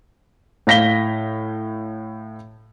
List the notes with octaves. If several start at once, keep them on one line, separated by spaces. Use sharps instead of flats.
A2 F5 A#6 B6 G7